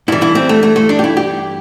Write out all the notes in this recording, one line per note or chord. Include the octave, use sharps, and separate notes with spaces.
G2 E3 E4
E4
C4
A3
A3
A3
D4
G4
E4
G4